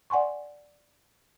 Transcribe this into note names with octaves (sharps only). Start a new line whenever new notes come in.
D5 F#5 G#5 C6 C#6